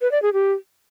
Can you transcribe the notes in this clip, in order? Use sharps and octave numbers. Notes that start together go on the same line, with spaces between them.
B4
D5
G#4
G4